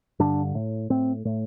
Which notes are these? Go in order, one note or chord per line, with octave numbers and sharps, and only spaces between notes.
G2 D3 D4
A2
A2 C4
A2